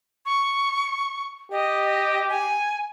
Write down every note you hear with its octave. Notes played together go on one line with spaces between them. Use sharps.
C#6
G4 D#5
G#5